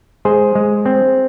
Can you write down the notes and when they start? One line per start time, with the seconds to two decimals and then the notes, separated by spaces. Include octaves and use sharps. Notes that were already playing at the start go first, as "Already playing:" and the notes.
0.25 G#3 G#4 C5
0.55 G#3
0.86 C4